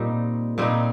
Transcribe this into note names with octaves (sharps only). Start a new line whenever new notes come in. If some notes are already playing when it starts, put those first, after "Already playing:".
Already playing: A#2 G3 C4 D#4
A#2 G3 C4 D#4